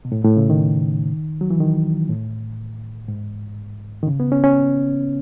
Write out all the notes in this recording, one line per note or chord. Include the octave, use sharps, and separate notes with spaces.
B2
A2
A2
C#3
D#3
F#3
E3
D#3
A2
G#2
D#3
C#3
B3
C#4
C#4